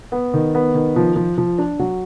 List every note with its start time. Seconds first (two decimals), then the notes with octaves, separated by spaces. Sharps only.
0.12 B3
0.34 D#3
0.55 B3
0.74 D#3
0.96 F3
1.16 F3
1.38 F3
1.58 D4
1.79 F#3